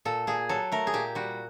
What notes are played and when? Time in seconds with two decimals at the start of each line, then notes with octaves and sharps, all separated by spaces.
0.05 A#2 A4
0.27 A#2 G#4
0.49 F#3 A4
0.72 A3 A#4
0.87 G#4
0.93 A#2 G4
1.15 G3 F#4